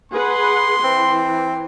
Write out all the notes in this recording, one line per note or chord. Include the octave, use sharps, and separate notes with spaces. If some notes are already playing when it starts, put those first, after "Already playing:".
G#4 B4 F#5 C6
E3 C4